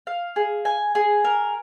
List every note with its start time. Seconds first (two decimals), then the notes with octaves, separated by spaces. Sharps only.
0.07 F5
0.36 G#4
0.65 G#5
0.95 G#4
1.24 A#4